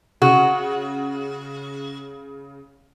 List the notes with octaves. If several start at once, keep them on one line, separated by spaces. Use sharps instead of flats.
C#3 F#4